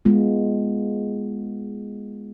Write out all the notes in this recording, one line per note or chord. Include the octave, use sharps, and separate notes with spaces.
G#3 B3 F4